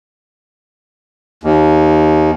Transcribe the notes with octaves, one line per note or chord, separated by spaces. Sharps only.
D#2